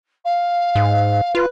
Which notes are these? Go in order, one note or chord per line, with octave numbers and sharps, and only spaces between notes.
F5
G#2
F4 B4